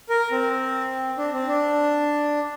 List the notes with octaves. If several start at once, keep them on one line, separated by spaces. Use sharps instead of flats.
A#4
C4
D4
C4
D4